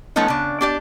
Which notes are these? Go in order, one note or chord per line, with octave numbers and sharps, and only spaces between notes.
F3 A3 B3 C#4 D#4
C#3 D4
D4 G4 D5